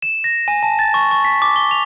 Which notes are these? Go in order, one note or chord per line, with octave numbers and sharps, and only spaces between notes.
E7
A#6
G#5
A5
A6
C#6
C#6
B6
D6
G7
F7